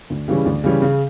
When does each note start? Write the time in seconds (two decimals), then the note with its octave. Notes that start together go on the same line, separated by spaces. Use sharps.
0.10 D2
0.28 C#3 E3 G3 C#4
0.45 D2
0.64 C#3 E3 G3 C#4
0.82 C#3